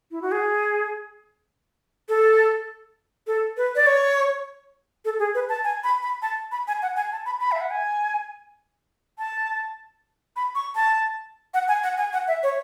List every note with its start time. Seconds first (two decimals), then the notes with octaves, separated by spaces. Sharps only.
0.11 E4
0.22 F#4
0.32 G#4
2.09 A4
3.27 A4
3.57 B4
3.76 D5
3.87 C#5
5.05 A4
5.19 G#4
5.35 B4
5.49 A5
5.64 G#5
5.84 B5
6.02 B5
6.22 A5
6.52 B5
6.68 G#5
6.82 F#5
6.96 G#5
7.12 A5
7.26 B5
7.40 B5
7.52 E5
7.61 F#5
7.71 G#5
9.19 A5
10.36 B5
10.55 C#6
10.76 A5
11.54 F#5
11.68 G#5
11.83 F#5
11.98 G#5
12.13 F#5
12.28 E5
12.43 C#5